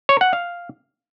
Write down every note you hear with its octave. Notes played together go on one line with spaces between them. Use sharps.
C#5
F#5
F5